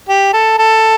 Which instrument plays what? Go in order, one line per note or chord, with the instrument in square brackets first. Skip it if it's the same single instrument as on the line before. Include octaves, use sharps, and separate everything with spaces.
[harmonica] G4
A4
A4